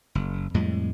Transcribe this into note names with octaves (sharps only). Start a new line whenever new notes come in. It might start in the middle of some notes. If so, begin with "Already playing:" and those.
F#1
F2 A2 G3 G#3